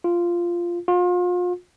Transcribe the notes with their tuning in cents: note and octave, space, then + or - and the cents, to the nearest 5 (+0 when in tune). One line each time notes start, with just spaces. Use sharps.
F4 -10
F4 +35